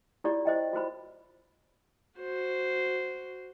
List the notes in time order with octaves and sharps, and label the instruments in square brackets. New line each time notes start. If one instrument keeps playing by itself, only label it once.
[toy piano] E4 F4 G4 C#5 D5
C5 D#5 G5
F4 F#4 C5 B5
[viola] F#4 C5